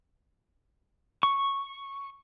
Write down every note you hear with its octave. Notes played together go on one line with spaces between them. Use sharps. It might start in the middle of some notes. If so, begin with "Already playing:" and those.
C#6